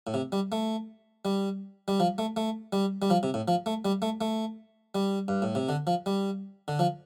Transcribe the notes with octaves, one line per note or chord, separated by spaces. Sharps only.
A2
C3
G3
A3
G3
G3
F3
A3
A3
G3
G3
F3
C3
A2
F3
A3
G3
A3
A3
G3
G2
A2
C3
D3
F3
G3
D3
F3